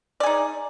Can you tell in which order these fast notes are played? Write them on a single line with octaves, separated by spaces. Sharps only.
D5 G#4 D#4